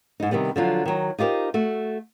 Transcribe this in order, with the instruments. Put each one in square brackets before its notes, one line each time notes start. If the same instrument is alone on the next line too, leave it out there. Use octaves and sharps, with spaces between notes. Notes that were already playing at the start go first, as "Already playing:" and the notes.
[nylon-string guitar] G#2 D#4
C3 D#3 G3 B3
D3 F3 F#3 F4
D#3 F#3
D#4 F4 G4 A#4 C5
A3 F#4